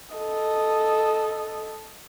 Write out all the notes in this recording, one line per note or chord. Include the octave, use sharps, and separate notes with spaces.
A4 D#5